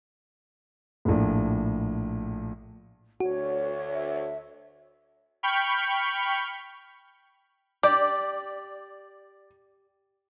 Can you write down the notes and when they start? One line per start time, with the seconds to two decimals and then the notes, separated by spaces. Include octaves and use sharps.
1.05 A#1 A2
3.20 D2 F#4 C#5
3.95 E5
5.43 G5 B5 C#6 F6 G6
7.83 G4 D5